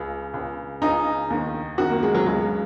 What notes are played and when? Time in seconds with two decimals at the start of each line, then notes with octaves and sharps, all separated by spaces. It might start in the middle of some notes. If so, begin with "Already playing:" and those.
Already playing: C#2 C#3
0.34 C#2 C#3
0.82 C#2 C#3 D#4
1.30 D#2 D#3
1.78 F#2 D#3 F#4
1.90 A#3
2.03 G#3
2.15 F#3
2.26 C#2 C#3 G#3